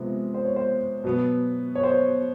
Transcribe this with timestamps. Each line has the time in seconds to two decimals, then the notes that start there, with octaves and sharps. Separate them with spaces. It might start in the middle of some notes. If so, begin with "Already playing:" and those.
Already playing: C3 F3 G#3 B3
0.34 C5
0.45 C#5
0.56 C5
1.04 B2 F#3 B3
1.75 C#5
1.83 C5
1.91 C#5